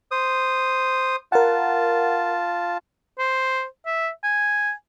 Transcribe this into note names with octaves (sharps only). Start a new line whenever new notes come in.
C5 D#6
F4 A#4 F#5 A5
C5
E5
G#5